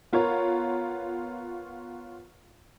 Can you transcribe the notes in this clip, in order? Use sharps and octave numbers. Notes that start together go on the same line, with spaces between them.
B3 F4 A#4 C#5